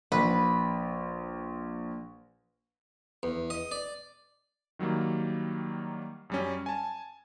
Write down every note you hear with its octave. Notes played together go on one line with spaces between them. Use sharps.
A#1 B4
E2
D#5
D5
D#3 F#3 G3 A#3
F#2 G3 C#4
G#5 A5